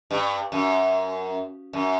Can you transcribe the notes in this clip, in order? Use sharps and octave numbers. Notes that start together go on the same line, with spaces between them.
G2
F#2
F#2